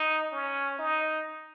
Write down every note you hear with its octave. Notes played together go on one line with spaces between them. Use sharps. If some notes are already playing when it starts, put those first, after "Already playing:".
Already playing: D#4
C#4
D#4